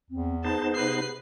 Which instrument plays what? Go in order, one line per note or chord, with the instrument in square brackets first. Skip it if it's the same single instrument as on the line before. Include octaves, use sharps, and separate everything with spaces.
[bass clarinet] E2 [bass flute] C4
[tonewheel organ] B3 D#4 C5 [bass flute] G#4 [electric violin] A5
[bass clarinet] C3 [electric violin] B4 C7